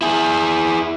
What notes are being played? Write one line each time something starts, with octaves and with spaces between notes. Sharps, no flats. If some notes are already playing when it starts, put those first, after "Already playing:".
E4 G#4